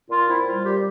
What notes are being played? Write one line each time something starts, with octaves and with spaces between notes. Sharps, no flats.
A#2 F4
C4 E4
G3 F4
A#2 G4